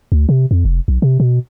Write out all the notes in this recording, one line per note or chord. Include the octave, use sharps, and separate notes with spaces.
D2
C3
F2
F1
B1
C3
B2